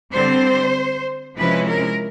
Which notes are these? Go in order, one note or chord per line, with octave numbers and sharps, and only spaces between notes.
D3 G3 C4 C5
C3 F3 G#3 C#4 E4 B4
A#4